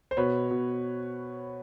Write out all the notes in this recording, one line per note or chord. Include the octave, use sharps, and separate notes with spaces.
C5
B2 B4 C#5
B2